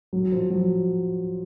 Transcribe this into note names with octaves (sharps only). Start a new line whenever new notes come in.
F#3
F3
F#3